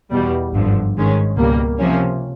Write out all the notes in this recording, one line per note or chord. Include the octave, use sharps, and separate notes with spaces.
E2 B2 G3
G#1 G2 D3 F3
G#1 G#2 D#3 G#3 C#4
C#2 B2 G3 A#3
C3 F3 A#3 C#4